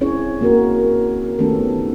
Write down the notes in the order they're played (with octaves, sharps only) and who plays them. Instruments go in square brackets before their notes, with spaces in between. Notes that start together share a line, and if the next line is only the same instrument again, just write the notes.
[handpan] C4 C#4 E4 G#4 C#5
A#3 F#4 A#4
D#3 A3 B3 C#4 G4 A4